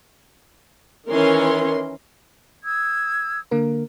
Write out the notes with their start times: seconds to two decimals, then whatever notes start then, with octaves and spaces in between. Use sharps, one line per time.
1.08 D#3 E3 C#4 A#4 C6
2.64 D#6 E6 G#6
3.51 D3 A#3 A#4